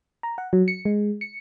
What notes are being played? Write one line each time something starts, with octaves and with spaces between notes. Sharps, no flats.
A#5
F#5
F#3
C#7
G#3
C#7